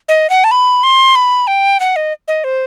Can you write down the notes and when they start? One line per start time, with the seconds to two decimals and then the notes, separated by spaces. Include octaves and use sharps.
0.09 D#5
0.30 F#5
0.44 A5
0.51 B5
0.83 C6
1.15 B5
1.47 G5
1.80 F#5
1.96 D#5
2.28 D#5
2.44 C5